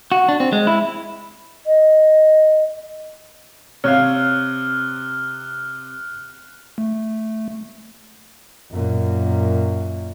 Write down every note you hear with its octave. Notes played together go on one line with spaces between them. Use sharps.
F#4
D4
C4
G#3
E4
D#5
C3 C#5 F5 F6 F#6
A3
F#2 A#2